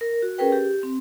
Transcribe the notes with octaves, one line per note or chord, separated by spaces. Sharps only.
A#4
F#4
C#4 G#4 A#4 B4 G5
G4
C4